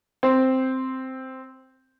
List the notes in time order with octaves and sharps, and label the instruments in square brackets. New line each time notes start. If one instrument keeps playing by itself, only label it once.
[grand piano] C4 C5